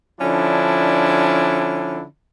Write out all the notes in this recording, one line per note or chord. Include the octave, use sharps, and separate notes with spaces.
D3 F3 C#4 D4 E4